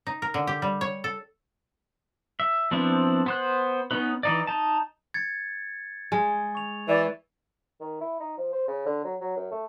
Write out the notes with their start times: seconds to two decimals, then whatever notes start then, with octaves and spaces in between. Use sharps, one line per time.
0.07 D#4
0.22 A#4
0.34 D3
0.47 G4
0.62 G3
0.81 C#5
1.04 A4
2.40 E5
2.71 F3 B3 C4 D4 E4
3.26 B3 C5 F#6
3.91 B3 C#4 D#4 B4
4.23 E3 D#4 D5
4.47 D#4 A5
5.14 G#6 A6 C#7
6.12 G#3
6.55 C#6 F7
6.88 E3 D5
7.80 D#3
8.01 E4
8.20 D#4
8.37 F3
8.52 C5
8.68 C#3
8.86 D3
9.04 F#3
9.21 F#3
9.37 F#2
9.51 A3